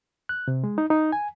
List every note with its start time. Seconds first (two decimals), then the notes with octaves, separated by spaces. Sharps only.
0.29 F#6
0.48 C3
0.64 G#3
0.78 D#4
0.90 D#4
1.12 G#5